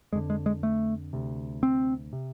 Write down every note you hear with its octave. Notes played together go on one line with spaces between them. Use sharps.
F2 D3 G#3
G#3
G#3
A3
D2 C3
C4
C3